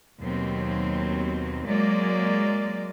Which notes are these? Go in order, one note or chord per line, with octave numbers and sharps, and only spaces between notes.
D#2 B2 F#3 C4
F#3 G#3 A#3 D5